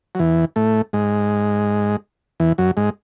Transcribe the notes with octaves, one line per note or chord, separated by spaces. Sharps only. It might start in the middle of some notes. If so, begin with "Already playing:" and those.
F#3
E2 E3
A2 A3
G#2 G#3
E2 E3
F#2 F#3
G#2 G#3